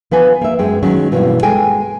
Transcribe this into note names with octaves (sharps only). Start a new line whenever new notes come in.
F3 B3 B4 G#5
A#3 E5
F#2 G#3 G5
D#3 F#3 G#3 C#4
G2 B2 E3 A#3
G#3 A4 G5 G#5